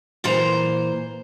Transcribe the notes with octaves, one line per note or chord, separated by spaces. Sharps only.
A#2 E3 C5 A#5